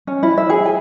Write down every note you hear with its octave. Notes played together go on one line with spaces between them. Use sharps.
C#4
E4
E5
G#4
G#5